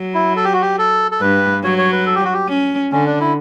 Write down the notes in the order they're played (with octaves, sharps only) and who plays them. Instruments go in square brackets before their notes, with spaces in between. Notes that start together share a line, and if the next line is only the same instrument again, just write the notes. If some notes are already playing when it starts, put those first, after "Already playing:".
Already playing: [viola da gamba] F#3
[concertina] E4
A4
G4
F#4
G4
A4
A4
[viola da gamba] G2 [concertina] B4
[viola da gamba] F#3 [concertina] C#5
[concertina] C#5
B4
A4
G4
F#4
G4
[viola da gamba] C#4
[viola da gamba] D3 [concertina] C#4
[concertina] D4
E4